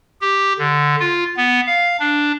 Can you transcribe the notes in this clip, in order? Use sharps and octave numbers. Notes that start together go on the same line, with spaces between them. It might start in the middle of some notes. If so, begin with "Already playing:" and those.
G4
D3
F4
B3
F5
D4